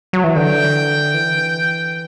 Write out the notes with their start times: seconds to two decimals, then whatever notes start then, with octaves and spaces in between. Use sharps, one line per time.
0.13 F#3
0.24 E3
0.35 D3 G5
1.14 E3